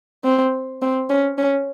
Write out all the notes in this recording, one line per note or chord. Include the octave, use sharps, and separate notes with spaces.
C4
C4
C#4
C#4